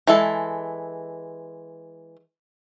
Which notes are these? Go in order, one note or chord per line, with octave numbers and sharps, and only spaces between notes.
E3 G#3 A4